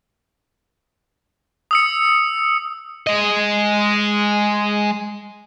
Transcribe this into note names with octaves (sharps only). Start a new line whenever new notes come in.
D#6 E6 C#7
G#3 D#5